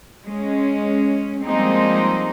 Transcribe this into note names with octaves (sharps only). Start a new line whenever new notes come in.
G#3 C#4
F3 G3 G#3 A#3 C4 D#4